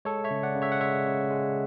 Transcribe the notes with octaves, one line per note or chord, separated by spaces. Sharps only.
G#3 A4 C#5
C#5 E5
C#3
D5 F#5
C#3
C#5 E5
F#5
G#3 C#5 E5
C#3
G#3